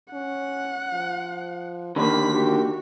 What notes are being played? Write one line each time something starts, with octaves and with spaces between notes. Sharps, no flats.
C#4 F#5
F3
D3 D#3 A#3 G4 B5 B6
F#4 G4